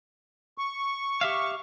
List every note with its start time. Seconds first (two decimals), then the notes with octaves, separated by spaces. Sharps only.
0.58 C#6
1.21 G4 E5 F5